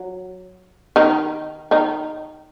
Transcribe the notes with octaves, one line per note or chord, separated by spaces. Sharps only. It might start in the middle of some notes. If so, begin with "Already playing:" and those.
Already playing: F#3
D#3 D#4
D#3 D#4